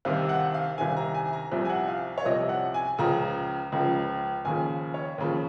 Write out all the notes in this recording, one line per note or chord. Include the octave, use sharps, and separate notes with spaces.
C2 C3 D#3 F5
F#5
F5
C2 C3 D#3 G#5
A#5
G#5
A#5
C2 C3 F3
G#5
F#5
F5
C#5
C2 C3 F3 D#5
F#5
G#5
C#2 C#3 F3 A#5
C#2 C#3 F3
D#2 C#3 F3 G#5
C#5
D#2 C#3 F3